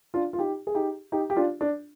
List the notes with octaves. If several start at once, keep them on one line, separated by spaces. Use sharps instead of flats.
D4 F4
F4
D#4 G4
G#4
D#4 G4
D#4 G4
G4
D4 F4
D4